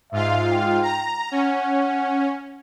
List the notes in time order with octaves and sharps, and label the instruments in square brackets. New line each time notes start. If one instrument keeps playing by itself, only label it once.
[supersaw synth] G#2 F4 F5 [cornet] E5
[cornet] G5
[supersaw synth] A#5
[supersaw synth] C#4 [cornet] F#5